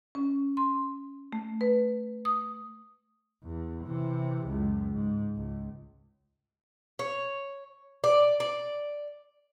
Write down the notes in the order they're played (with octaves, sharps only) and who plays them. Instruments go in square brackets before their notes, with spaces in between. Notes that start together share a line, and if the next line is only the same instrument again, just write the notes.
[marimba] C#4
C6
A3
B4
D#6
[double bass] E2
C3 E3
C#2 F#2
G#2
C#2
[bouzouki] C#5
D5
D5